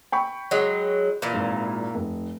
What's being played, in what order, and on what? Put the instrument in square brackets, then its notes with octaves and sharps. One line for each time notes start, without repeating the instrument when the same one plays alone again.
[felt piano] G5 B5 C#6
[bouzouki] F#3 G#3
A#2 E3
[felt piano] G#1
F1